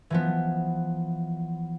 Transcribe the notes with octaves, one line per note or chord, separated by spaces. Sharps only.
E3 F3 B3